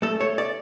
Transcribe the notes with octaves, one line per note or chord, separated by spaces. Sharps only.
A3 A4
A3 C#5
D5